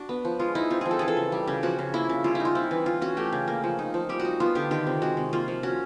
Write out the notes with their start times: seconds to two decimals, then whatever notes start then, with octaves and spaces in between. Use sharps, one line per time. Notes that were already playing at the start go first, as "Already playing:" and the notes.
Already playing: D4 F#4
0.09 B3
0.25 F3
0.39 G#3 F4
0.55 D#4 E4
0.70 C4 F4
0.81 F3 G#4
0.91 A4
0.99 E3 G#4
1.08 A4
1.17 C#3
1.32 G3
1.47 C#3 G4
1.63 F3 F#4
1.79 C#3
1.94 A#3 E4
2.09 C#3
2.24 G3 F4
2.35 D#4 E4
2.45 F4
2.55 C4 E4
2.71 E3
2.86 E3 F4
3.02 C#4 F#4
3.17 A3 G4
3.32 C#3
3.48 A#3
3.64 F3
3.79 D#4
3.94 F3
4.09 G3 G4
4.20 F#4
4.25 D#4
4.40 B3 F4
4.55 D3 G4
4.71 D#3 G4
4.87 C3
5.02 G#3 F#4
5.17 C3
5.33 A#3 F4
5.48 F3
5.63 C#4 F#4